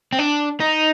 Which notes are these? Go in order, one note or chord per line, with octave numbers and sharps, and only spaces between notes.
C4
D4
D#4